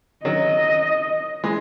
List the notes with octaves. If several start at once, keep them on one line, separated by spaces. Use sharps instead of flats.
D#3 F#3 D#5
E3 G#3